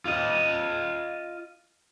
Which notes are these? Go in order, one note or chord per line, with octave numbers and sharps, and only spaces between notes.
F4 D#5